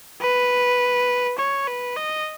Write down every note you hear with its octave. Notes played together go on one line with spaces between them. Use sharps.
B4
C#5
B4
D#5